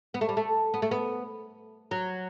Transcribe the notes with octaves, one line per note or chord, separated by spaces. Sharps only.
B3
A3
G3
A3
B3
A3
B3
F#3